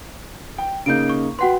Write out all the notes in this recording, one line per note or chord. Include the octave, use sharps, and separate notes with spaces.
G5
C#3 A#3 D#4 G6 D7
C#6
F#4 B4 F#5 G5 C6